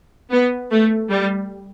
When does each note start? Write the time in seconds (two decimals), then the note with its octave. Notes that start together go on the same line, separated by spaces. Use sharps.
0.31 B3
0.71 A3
1.10 G3